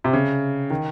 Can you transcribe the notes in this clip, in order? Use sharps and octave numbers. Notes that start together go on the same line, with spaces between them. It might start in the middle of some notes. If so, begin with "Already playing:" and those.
C3
C#3
D#3